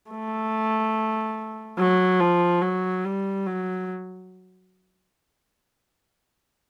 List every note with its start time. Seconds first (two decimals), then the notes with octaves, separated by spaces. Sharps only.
0.11 A3
1.78 F#3
2.20 F3
2.62 F#3
3.05 G3
3.46 F#3